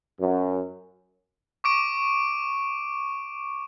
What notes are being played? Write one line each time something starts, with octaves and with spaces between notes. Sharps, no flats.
F#2
C#6 D6 D7